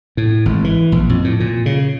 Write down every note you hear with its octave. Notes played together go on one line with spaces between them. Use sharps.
A2
G#1
E3
A#1
F2
A2
A#2
C#3